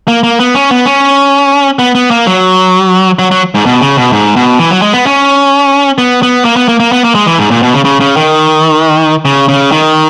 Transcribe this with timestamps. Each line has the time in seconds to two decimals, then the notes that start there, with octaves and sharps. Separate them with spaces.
0.08 A#3
0.23 A#3
0.40 B3
0.55 C#4
0.71 B3
0.86 C#4
1.79 B3
1.95 B3
2.11 A#3
2.27 F#3
3.19 F#3
3.31 F#3
3.55 G#2
3.66 B2
3.81 C#3
3.97 B2
4.12 G#2
4.36 B2
4.59 E3
4.71 F#3
4.82 G#3
4.93 B3
5.06 C#4
5.98 B3
6.23 B3
6.45 A#3
6.56 B3
6.68 A#3
6.80 A#3
6.92 B3
7.04 A#3
7.15 G#3
7.27 E3
7.38 G#2
7.51 A#2
7.62 B2
7.74 C#3
7.85 C#3
8.01 C#3
8.17 D#3
9.25 C#3
9.48 C#3
9.72 D#3